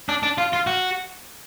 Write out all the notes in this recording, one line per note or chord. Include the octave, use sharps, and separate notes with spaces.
D4
D4
F4
F4
F#4